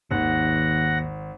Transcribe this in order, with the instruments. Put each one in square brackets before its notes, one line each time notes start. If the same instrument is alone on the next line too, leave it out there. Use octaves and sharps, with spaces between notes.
[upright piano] G#1 [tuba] D#2 [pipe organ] F#5 A#6